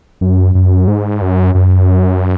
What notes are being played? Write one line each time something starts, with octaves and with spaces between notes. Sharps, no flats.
F#2
F#2
G#2
F#2
F#2